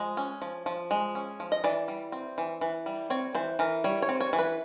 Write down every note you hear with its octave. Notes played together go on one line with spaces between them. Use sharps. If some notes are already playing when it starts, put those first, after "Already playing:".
Already playing: F3 G#3
C#4
F3
F3
G#3
C#4
F3
D#5
E3 D5
G3
C4
E3
E3
G3
C4 C#5
E3 C5
E3 A#4
G3 C#5
C#5
C4
C#5
E3
B4